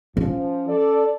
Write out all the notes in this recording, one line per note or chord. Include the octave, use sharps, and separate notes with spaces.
F3 C#4
A4 D5